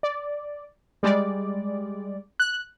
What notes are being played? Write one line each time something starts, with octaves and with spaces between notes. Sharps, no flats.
D5
G3 G#3 D5
F#6